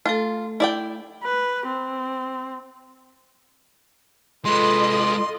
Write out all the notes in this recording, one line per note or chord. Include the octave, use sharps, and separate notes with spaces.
A3 F4 A4
E4 D5 G5
B4
C4
G#3 F4 A4 B4 D#5 C6